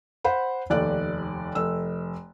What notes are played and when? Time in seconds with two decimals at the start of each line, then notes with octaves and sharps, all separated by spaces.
0.24 C5 F#5 B5
0.70 F1 D#2 D5 F#6
1.55 F1 E6